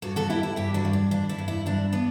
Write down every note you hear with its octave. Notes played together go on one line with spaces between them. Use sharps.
G2 F#4 A4
F#4 A4
G2 E4 G4
E4
G2 E4 G4
D4 F#4
G2
D4
G2 D4
E4
G2
E4
G2 D4
B3 D4